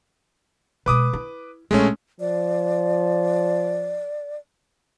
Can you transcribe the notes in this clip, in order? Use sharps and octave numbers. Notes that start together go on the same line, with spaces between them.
B2 G#3 B4 D6 D#6
E4
A#1 G#3 A3 C#4
F3 D5